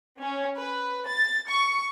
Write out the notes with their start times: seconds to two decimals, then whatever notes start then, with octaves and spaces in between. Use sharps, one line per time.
0.20 C#4
0.57 B4
1.08 A6
1.48 C#6